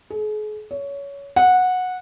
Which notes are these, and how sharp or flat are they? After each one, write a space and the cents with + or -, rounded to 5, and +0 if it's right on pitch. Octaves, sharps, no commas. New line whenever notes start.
G#4 +40
C#5 +20
F#5 -15